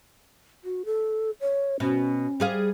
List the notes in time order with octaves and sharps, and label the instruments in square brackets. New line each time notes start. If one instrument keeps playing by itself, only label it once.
[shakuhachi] F#4
A4
C#5
[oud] B2 [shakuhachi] C#4
[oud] G3 G#4 F5